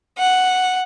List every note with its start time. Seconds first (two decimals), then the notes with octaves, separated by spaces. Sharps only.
0.19 F#5